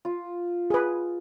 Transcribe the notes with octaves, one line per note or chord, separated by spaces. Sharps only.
F4
G#4 B4